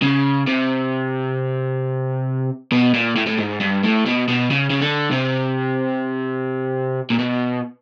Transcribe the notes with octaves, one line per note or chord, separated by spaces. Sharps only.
C#3
C3
B2
A#2
A2
A2
G#2
G2
A2
B2
B2
C#3
C#3
D3
C3
A#2
B2